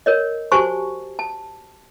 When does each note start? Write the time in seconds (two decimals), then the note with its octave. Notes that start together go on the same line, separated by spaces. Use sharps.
0.06 A#4 C#5 D#5
0.52 F#4 G4 C5 G#5 A5 C#6
1.19 A5